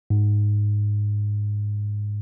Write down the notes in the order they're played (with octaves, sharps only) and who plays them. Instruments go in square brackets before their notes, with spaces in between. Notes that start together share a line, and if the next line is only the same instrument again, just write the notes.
[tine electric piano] G#2